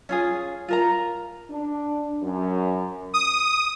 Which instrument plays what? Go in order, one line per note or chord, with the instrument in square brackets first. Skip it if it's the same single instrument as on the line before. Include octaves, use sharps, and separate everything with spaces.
[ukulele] C#4 F4 G#4
F4 A#4 A#5
[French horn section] D4
F#2
[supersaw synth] D#6